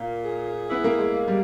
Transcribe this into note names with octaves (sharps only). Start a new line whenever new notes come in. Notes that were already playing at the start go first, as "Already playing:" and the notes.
Already playing: A#2 A#3
G#4
B3 E4
A#3
G#3
A#3
G3